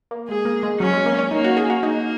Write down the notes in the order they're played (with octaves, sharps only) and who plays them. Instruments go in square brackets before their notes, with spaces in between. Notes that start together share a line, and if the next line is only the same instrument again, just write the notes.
[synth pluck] A#3
[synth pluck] G#3 [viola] G#4
[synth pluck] A#3
G#3
[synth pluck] F#3 [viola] C#4
[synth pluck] G#3
A#3
C#4
[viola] A#3 [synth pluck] D#4
[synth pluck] F#4
G#4
F#4
[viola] A#3 [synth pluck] D#4